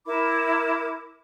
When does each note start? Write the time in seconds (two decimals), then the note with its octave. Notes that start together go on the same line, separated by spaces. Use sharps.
0.06 E4 A#4 B5 D6